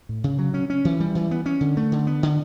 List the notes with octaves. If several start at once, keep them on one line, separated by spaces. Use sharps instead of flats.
A2
C#3
F#3
C#4
C#4
E3
G3
E3
B3
C#4
D3
A3
D3
B3
D3